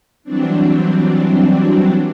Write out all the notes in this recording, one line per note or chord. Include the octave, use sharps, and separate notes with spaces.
E3 F#3 G3 C4 D4